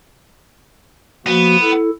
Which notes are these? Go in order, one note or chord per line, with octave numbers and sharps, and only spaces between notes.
F3 A#3 B3 F#4
E4 A4